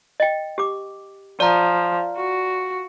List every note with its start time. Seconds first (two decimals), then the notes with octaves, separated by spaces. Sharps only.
0.20 D#5 G5
0.58 G4 D6
1.40 F3 D5 A#5
2.17 F#4